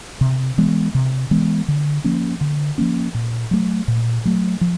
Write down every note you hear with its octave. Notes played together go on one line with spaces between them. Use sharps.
C3
E3 G#3 B3
C3
E3 G#3 B3
D3
F3 A#3 C#4
D3
F3 A#3 C#4
A#2
F#3 A3
A#2
F#3 A3
F3